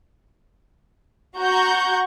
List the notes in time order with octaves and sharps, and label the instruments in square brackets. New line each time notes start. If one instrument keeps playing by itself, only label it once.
[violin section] F#4 F#5 A#5 C#6 G6